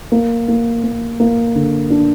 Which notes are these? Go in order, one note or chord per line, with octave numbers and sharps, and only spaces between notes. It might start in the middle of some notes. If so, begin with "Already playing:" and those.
A#3
A#3
A#3
A#3
D3
D4